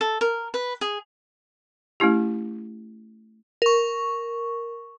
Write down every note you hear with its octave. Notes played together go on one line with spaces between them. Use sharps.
A4
A#4
B4
G#4
A3 C#4 E4 G4
A#4 C#6